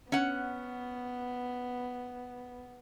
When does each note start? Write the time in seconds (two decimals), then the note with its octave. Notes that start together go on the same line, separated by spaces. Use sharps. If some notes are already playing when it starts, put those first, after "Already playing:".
0.12 B3 C#4 F#5